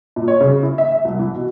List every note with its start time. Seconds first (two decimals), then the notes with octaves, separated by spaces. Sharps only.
0.16 A#2
0.28 C#5
0.41 C#3
0.63 E4
0.78 E5
0.92 E5
1.05 C2
1.19 E3
1.34 B2